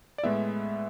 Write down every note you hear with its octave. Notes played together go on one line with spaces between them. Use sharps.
D5
A2 G#3 B3 E4 E5